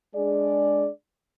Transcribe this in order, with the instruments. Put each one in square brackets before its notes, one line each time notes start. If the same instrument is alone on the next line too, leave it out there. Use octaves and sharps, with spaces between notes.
[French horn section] G#3 D4 G#4 D5